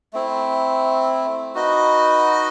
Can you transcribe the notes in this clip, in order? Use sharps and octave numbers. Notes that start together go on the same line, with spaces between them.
A3 C4 E4
D#4 F#4 B4 D#5